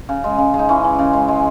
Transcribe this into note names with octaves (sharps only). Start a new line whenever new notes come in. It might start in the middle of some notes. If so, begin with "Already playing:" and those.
C#3
G#3
C#3
G#3
D#4
E3 C#4
E3
C#3
G#3
G#3